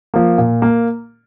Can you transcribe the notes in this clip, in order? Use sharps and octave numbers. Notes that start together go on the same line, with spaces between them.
F3 A#3
A#2
A#3